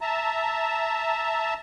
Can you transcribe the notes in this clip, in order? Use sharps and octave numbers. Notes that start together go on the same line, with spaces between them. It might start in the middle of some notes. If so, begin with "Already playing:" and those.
E5 A5 A#5